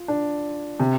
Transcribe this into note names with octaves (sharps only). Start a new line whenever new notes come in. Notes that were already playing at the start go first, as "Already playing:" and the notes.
Already playing: F4
D4
C3